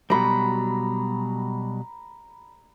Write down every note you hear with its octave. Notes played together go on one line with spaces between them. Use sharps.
B2 F#3 G3 A#5 B5